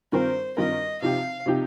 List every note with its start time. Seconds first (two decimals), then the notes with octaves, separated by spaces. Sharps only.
0.12 G2 D#3 C4 F4 A#4 C5
0.57 G2 D#3 C4 F4 A#4 D#5
1.02 C3 F3 D#4 G4 F5
1.46 C3 F3 D#4 G4